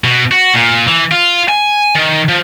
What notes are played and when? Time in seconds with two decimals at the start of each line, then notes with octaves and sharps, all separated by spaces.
0.04 B2
0.31 F#4
0.54 A#2
0.88 E3
1.12 F4
1.48 G#5
1.95 D#3
2.29 F3